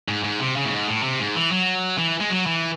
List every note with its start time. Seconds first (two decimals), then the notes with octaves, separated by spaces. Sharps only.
0.08 G#2
0.24 G#2
0.40 C3
0.56 C#3
0.65 A2
0.71 G#2
0.87 A2
1.03 C3
1.19 G#2
1.35 E3
1.52 F#3
1.98 E3
2.20 G#3
2.30 F#3
2.46 E3